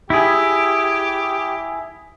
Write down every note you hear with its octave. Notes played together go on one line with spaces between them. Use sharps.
E4 G4 G#4